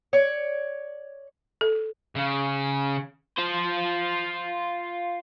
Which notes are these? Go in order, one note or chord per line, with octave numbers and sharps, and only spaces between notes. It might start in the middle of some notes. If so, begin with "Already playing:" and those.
C#5 D5
A4
C#3
F4 C5